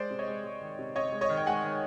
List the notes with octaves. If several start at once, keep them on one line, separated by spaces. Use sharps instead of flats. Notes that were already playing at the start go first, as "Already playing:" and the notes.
Already playing: G#3 C5 D5
C3
C#5 D#5
G#3
G#3
D#3
C3
C3 C#5 D#5
G#3
C#5 D#5
D#3
G5
G#3 F#5 G#5
D#3